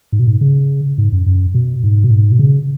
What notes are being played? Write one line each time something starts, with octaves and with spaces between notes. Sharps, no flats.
G#2
B2
G#2
C#3
G#2
F#2
F#2
B2
G#2
B2
G#2
B2
C#3